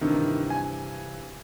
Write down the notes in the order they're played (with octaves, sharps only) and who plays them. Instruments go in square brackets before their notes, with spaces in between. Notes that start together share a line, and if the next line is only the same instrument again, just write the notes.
[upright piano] G2 C3 E3 [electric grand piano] D#3
[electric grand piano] G#5